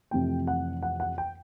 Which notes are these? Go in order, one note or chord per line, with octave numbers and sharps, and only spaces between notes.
F2 C3 E3 A3 G5
F#5
F#5
F#5
G5